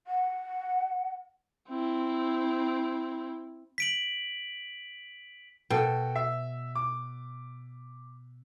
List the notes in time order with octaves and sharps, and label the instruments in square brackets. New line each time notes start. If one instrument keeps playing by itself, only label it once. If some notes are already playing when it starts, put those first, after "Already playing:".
[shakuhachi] F#5
[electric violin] C4 E4
[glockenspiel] B6 D7 F#7
[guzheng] B2 [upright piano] F#4 A4 G5
[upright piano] E5
D6